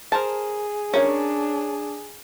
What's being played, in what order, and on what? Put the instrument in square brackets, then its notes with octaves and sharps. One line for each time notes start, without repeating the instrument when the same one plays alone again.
[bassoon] G#4 [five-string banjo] A#4 C5 A5
[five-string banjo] C#4 [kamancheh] D4 [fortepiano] A#4 C#5